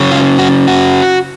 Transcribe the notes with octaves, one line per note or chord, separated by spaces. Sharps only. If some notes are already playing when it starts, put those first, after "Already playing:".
Already playing: C#3 F#3 C#4
F4
F#4
F#4